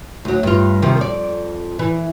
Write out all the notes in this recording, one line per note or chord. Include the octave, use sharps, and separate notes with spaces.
D2 F#3
G2 F4
C3 D#3 F3
F2 D5
E3